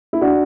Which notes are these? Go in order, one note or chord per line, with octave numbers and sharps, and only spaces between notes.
E4
D4 F#4